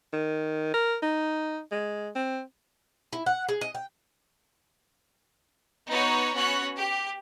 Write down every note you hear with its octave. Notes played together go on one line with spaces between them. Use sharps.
D#3
A#4
D#4
G#3
C4
E4
F#5
G#4
D#5
G5
B3 D#4 F#4 C#5
B3 C#4 F#4 C#5 F#6
G4